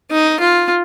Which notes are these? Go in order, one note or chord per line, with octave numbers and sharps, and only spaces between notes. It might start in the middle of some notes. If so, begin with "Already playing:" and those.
D#4
F4